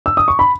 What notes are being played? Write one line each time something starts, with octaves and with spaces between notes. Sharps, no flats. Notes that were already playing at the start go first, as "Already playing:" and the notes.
E6
D#6
C#6
B5